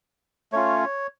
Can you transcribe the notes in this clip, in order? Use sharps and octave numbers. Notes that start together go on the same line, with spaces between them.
A3 C#4 F4 C#5